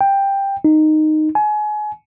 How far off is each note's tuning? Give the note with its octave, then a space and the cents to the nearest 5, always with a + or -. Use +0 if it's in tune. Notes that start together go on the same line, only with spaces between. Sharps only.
G5 +10
D#4 -10
G#5 +30